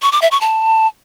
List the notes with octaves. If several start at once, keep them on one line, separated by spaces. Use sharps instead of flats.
C#6
D6
E5
C#6
A5